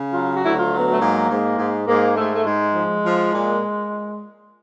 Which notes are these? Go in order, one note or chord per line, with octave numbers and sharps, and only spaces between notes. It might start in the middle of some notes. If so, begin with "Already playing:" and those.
Already playing: C#3
F#3 F4
F#4
D2 E4
F4
F#3
B3
A3
G#2 A#3
G#2
G#2
G#2 A#3
G#2 A3
A3
G#2 G#3
F3
F3
A#2